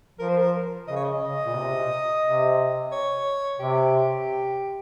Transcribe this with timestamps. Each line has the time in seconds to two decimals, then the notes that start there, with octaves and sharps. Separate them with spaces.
0.18 F3 A#4
0.29 C5
0.38 A#4
0.87 C#3 D#5
0.96 C#5
1.05 D#5
1.46 A#2
1.55 C3
2.23 C3
2.92 C#5
3.59 C3 G4